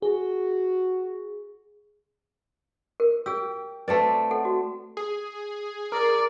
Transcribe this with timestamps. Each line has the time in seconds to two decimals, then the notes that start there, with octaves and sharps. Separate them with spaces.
0.02 F#4 G#4
3.00 A#4
3.26 G4 G#4 E6
3.88 A3 C4 B4 D5
4.31 A4 F#5
4.45 F#4
4.97 G#4
5.92 A#4 D5